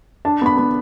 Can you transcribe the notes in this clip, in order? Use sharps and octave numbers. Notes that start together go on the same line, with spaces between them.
D4 A5
B3 B5
B3